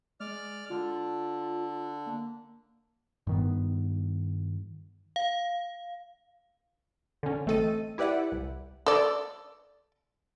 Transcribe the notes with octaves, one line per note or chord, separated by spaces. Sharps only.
G#3 D5 F6
D3 F4
A#3
G2 D#3 B3
F5
D3 C#4
A1 A3 C4 A4 D#5 D#7
E4 G4 B4 D5 E5 F#5
C2
A4 D5